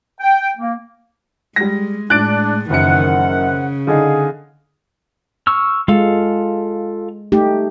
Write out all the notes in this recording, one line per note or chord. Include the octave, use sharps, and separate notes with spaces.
G5
A#3
G3 G#3 A#6
A2 G#3 D4 F#6 A6 D7
F#1 F#2 D#3 E3 C4 A#4 F#5 C#7
C#3
D3 D#4 G#4 F5
C#6 E6 F6
G#3 F4 A4 F5
A3 D#4 G4